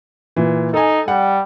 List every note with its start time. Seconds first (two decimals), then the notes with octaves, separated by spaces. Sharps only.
0.36 A#2 E3
0.74 D#4 A4 G#5
1.08 G3 F#5